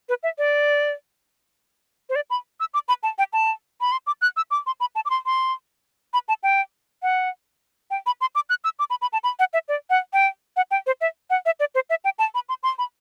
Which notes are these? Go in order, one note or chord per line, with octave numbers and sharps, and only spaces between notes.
B4
E5
D5
C5
D5
B5
E6
D6
B5
A5
G5
A5
B5
C6
D6
F#6
E6
D6
C6
B5
A5
D6
C6
C6
B5
A5
G5
F#5
G5
B5
C6
D6
F#6
E6
D6
B5
B5
A5
B5
F#5
E5
D5
F#5
G5
F#5
G5
C5
E5
F#5
E5
D5
C5
E5
G5
A5
B5
C6
C6
B5